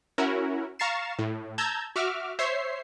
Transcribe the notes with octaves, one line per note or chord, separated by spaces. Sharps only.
C#4 E4 F#4 A#4
F5 A#5 C#6 A6 C7 E7
A2
A5 A#5 E6 G6 G#6
F#4 E5 D6 F6
C5 C#5 E5 C7